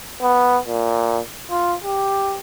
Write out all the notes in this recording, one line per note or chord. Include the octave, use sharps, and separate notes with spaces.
B3
A#2
F4
G4